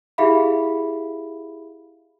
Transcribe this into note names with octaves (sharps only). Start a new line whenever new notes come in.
E4 G4 G#4 E5 F5 B5